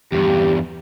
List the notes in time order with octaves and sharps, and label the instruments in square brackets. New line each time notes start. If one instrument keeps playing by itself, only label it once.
[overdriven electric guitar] E2 G2 [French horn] G4